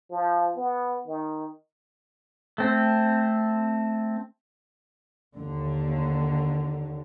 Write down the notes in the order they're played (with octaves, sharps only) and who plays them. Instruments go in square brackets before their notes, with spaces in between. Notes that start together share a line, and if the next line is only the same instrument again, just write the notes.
[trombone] F3
B3
D#3
[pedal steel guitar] A3 C4
[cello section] D#2 D3